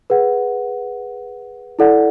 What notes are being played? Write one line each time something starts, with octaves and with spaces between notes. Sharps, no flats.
G#4 B4 F#5
E4 A4 D5 F#5